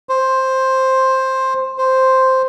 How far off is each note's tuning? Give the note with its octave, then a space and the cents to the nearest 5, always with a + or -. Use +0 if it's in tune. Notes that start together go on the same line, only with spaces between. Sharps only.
C5 +10
C5 +0